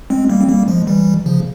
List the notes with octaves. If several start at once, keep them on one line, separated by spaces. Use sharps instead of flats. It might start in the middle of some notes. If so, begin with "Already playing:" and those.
G#3 C4
G3 A#3
C4
G3 A#3
F3 G#3
E3 G3
C#3 F3